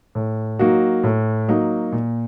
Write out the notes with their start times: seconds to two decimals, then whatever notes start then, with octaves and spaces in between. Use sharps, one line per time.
0.15 A2
0.59 F#3 A#3 D#4 F#4
1.04 A2
1.48 F#3 A#3 D#4 F#4
1.92 A#2